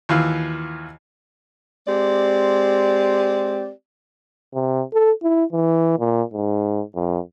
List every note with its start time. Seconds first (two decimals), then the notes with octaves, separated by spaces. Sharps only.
0.09 D#2 E3 F4
1.87 G#3 C4 G4 D5
4.54 C3
4.93 A4
5.23 E4
5.52 E3
5.99 A#2
6.33 G#2
6.95 F2